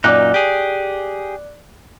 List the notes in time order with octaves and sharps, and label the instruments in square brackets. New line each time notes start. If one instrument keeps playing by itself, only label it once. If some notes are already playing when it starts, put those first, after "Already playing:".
[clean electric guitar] F#2 A#2 D#4 [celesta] D5 D6 F#6
[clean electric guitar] G4 G#4